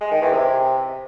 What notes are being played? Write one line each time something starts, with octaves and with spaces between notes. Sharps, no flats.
G#3
D#3
E2
C3